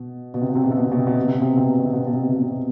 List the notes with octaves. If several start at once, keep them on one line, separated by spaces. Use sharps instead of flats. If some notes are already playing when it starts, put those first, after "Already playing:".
Already playing: B2
B2
C3
B2
C3
B2
C3
B2
C3
B2
C3
B2
C3
B2
C3
B2
C3
B2
C3
B2
C3
B2
C3
B2
C3
B2
C3
B2
C3
B2
C3
B2